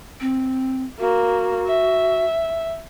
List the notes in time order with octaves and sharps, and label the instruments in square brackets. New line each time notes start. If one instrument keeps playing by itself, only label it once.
[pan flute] C4
[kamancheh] A#3 [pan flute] F#4
[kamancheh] E5